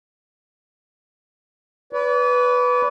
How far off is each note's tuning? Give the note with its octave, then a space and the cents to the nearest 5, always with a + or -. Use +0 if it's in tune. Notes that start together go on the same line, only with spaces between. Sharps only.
B4 +0 D5 -40